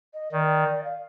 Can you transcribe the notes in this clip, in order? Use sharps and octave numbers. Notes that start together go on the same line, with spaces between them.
D#5
D#3 D5
F5